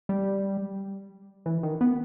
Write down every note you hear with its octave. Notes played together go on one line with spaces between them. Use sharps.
G3
E3
D#3
B3